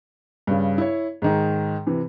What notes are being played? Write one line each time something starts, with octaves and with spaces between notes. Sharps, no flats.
G2 C#3
E4 C#5
G#2 D#3
C3 E3